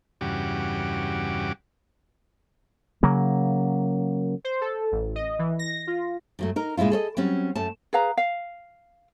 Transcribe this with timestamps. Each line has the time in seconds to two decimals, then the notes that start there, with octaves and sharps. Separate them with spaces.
0.21 E2 G2 C#3 F#4 G4 D6
3.03 C#3 F#3 A#3
4.44 C5
4.61 A4
4.92 A1
5.16 D#5
5.39 E3
5.59 A#6
5.87 F4
6.39 F#2 F#3 A3
6.56 D#4 A#4
6.77 A#2 G#3 C#4 E4 F4
6.90 G#4 A4 C#5 D#5
7.17 F#3 G3 C4 C#4
7.55 F#2 A3 C#4 A5
7.93 G#4 B4 F5 A#5
8.17 F5